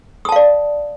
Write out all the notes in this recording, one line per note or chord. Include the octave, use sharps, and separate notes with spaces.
D5 F5 A5 D#6